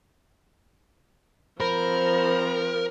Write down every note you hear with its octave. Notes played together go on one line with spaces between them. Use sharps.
F3 C4 A#4 C5 B5